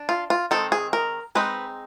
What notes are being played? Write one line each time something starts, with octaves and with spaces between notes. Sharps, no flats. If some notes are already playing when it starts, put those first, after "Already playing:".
Already playing: D4
F4
F4
D#3 G#3 C4 A4
G#4
A#4
G#3 C4 D#4 B4